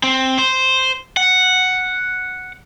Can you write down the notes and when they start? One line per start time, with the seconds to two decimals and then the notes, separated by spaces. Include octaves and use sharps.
0.03 C4
0.38 C5
1.17 F#5